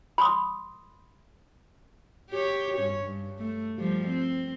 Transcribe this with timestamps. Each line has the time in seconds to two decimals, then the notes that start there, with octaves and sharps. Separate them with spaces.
0.18 B5 C6 D#6
2.30 G4 C#5
2.76 G2 C#4 C#5
3.05 G2
3.39 A3
3.77 F3 G3
4.08 C4